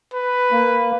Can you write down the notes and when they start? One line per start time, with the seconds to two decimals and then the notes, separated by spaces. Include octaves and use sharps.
0.13 B4
0.52 A#3